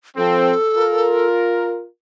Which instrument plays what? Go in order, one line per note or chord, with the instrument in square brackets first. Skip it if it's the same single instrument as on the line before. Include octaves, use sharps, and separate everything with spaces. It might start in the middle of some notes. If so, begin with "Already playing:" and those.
[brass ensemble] F3 C4 [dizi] A4
[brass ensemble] F4 A#4